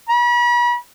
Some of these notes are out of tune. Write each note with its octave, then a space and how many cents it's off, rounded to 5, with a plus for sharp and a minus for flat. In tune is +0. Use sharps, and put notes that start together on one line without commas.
B5 -40